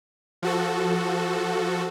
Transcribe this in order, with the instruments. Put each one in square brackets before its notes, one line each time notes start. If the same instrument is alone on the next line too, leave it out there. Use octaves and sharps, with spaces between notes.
[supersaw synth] F3 F#4 A4